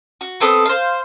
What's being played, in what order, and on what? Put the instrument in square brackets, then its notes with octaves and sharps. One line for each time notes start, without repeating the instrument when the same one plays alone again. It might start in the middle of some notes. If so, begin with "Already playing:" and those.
[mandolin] F#4
B3 C4 A4 D#6
C5 F5